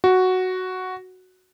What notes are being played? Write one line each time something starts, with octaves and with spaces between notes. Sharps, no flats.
F#4